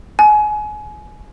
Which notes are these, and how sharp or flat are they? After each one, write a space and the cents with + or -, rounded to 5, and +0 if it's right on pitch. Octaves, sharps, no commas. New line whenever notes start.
G#5 +25